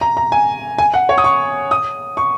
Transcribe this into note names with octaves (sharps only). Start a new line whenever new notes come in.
A#5
A#5
G#5
G#5
F#5
C#5
D#6
C#6
D#6
C#6